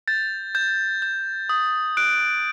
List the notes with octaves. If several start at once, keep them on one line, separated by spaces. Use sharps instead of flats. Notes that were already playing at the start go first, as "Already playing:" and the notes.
G6 A6
G6
G6
D#6
F#6 D7